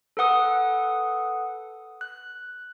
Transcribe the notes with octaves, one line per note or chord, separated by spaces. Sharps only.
A4 B4 F#5 D#6
F#6